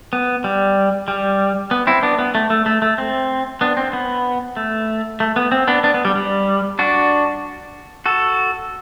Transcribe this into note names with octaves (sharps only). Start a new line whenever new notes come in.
B3
G3
G3
B3
C4 E4
B3 D4
B3
A3
A3
A3
A3
C4
B3 D4
C4
B3
A3
A3
B3
C4
B3 D4
B3 D4
B3
G3
G3
D4 F#4
F#4 A4